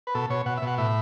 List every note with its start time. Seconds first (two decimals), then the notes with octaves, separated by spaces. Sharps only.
0.07 B4
0.15 B2 A4
0.30 B2 C#5
0.46 B2 F#5
0.57 E5
0.62 B2
0.67 F#5
0.78 A2 E5